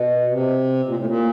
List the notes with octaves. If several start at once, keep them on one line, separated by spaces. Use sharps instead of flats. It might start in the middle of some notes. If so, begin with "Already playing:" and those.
Already playing: B2
C3
A#2
A2
A#2